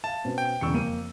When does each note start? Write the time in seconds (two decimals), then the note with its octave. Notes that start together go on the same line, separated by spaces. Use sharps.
0.04 E5 F5 A5
0.25 B2 C4 C#4
0.38 G5
0.61 E1 E2 C#3 C#6 E6 C#7
0.74 F2 A#3 D#7